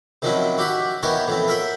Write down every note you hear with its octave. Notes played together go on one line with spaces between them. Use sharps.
C3 D#3 F3 F#3 C#4 E4
F#4 G4 E5 F#5
E3 B3 D#4 G4 A#4 C#5
A2 F3 C4
A#4 E5 F#5 G5